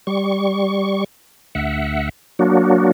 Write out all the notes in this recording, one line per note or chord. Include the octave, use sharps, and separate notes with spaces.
G3 C#6
D2 E5 F#5
F#3 A#3 D4 F#4